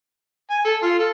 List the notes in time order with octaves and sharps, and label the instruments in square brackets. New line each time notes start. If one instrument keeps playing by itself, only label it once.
[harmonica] G#5
A4
F4
A4